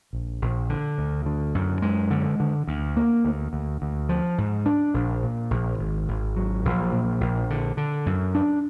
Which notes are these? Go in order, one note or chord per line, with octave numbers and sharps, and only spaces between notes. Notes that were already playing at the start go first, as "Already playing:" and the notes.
A#1
A#1
D3
D2
D3
F#2
G#3
D3
D3
D2
A#3
D2
D2
D2
F3
G#2
D4
A#1
A#2
A#1
G#1
G#1
F#3
A#1
A#2
A#1
D3
D3
F#2
D4